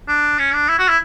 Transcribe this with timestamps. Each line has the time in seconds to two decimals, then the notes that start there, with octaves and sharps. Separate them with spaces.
0.08 D4
0.39 C#4
0.53 D4
0.69 E4
0.79 F#4
0.88 E4